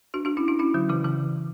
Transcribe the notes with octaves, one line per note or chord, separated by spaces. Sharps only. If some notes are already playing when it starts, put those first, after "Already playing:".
D4 F#4
D4 F#4
C#4 E4
D4 F#4
C#4 E4
D3 F#3
C#3 E3
C#3 E3